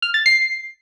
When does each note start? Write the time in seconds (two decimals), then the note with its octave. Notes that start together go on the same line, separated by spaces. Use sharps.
0.02 F6
0.14 A6
0.26 C7